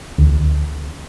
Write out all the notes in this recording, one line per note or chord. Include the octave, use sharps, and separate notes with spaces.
D2